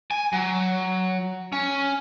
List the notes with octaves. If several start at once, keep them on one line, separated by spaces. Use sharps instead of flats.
G#5
F#3
C#4